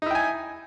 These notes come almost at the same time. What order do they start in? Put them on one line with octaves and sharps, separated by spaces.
D#4 E4 G5 G#5